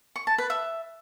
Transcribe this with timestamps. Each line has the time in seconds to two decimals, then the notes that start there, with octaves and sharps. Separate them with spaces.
0.16 C#6
0.27 A5
0.38 B4
0.50 E5